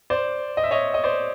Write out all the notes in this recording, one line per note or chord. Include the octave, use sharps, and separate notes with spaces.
C5 D5
D#5
E5
C#5 D#5
D#5
C5 D5